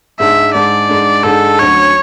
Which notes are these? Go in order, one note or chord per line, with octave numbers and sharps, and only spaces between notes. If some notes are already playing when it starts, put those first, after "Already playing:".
G#2 G#3 D4 E5
G#2 G#3 D4 D5
G#2 G#3 D4
G#2 G#3 D4 A4
D2 D3 F#3 C#4 C#5